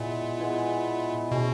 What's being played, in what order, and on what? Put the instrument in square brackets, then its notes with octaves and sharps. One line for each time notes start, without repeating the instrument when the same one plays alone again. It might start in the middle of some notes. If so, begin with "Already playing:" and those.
Already playing: [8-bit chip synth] A#2 [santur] G#3 B3 E4
[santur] G#3 B3 E4
[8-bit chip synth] B2 [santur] C#4 G#4 D#5